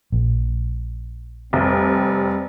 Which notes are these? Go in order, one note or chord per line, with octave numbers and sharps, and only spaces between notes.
A#1
F1 G3 C4